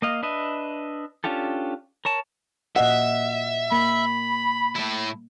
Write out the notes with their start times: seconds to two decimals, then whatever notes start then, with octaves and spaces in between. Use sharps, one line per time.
0.02 A#3 D#5 F5
0.23 D4 B4 D#5 E5
1.24 C#4 D4 F4 G4 A4
2.05 A#4 C#5 A5
2.76 A#2 D#5 E5 F#5
3.72 A#3 B5
4.75 A2 E4